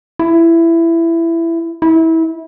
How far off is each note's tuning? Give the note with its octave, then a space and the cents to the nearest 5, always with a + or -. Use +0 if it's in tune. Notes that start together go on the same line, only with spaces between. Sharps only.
E4 +15
E4 -25